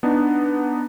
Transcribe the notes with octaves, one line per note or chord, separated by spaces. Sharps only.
B3 D4 D#4